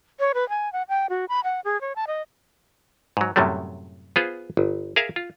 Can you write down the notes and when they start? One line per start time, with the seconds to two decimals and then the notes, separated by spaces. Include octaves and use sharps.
0.20 C#5
0.34 B4
0.49 G#5
0.73 F#5
0.89 G5
1.10 F#4
1.29 B5
1.44 F#5
1.65 G#4
1.81 C#5
1.96 A5
2.07 D#5
3.17 G#2 F#3
3.36 F#2 A2 C3 F#3 G3 A3
4.16 B3 F4 G#4 C5
4.57 G1
4.96 G#4 A#4 E5 F5
5.16 F4